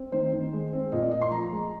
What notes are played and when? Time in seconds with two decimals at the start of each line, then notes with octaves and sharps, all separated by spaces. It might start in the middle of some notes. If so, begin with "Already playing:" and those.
Already playing: C4
0.12 D#3 C5
0.32 D#3
0.53 G#3
0.73 C4
0.92 A#2 D#5
1.02 D5
1.11 A#2 D#5
1.21 C6
1.31 F3 A#5
1.52 G#3